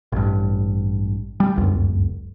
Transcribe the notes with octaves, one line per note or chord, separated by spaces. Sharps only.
A1 G2
G3
D1 G1 C#2 F#2